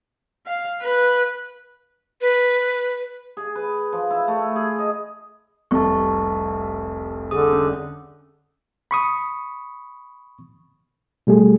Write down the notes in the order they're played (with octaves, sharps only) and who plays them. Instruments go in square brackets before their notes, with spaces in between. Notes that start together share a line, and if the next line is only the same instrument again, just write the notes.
[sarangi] F5
B4
[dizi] B4
[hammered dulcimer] G#4
B4
F3
E4
A3
G#4
D#5
[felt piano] F1 C2 [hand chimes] A5 C#6
[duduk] D3 [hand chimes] G#4 D#6
[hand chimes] C#4
[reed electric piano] B5 C#6 D#6
B2 G3 A3 G#4